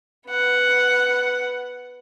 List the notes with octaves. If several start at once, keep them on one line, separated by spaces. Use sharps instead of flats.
B3 F#5